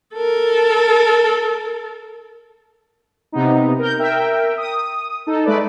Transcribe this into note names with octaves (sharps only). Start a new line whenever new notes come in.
A4 A#4
C3 B3 D#4
A#4 G6
A#4 E5 G5
D#6
D#4 A4
G#3 A3 B4 D5